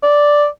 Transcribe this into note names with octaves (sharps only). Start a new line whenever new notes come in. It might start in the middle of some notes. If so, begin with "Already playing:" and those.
D5